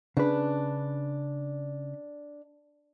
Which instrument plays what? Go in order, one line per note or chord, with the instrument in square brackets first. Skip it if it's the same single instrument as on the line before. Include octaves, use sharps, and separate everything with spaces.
[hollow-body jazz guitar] C#3 B4 [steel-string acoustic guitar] D4